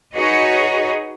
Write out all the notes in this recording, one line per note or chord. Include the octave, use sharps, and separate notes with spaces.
D#4 F#4 G#4 B4 C#5 D#5